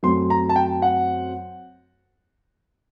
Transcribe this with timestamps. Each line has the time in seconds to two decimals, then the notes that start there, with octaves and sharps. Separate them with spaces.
0.03 F#2 F#3 A3 C4 C6
0.30 A#5
0.49 A5
0.56 G5
0.82 F#5